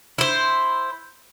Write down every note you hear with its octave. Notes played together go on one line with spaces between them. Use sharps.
E4 C5